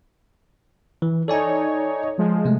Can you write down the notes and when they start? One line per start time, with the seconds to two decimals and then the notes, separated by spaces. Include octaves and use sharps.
1.02 E3
1.28 D#4 A4 C#5 D5 G#5
2.18 F3 G#3
2.45 C3 G#3 A3